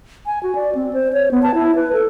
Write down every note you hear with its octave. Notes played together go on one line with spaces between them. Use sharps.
G#5
F#4
D5
C4
C5
C#5
B3
A5
E4
B4
A4